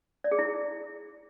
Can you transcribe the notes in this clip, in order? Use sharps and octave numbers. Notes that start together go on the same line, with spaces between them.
D5
G#4
E4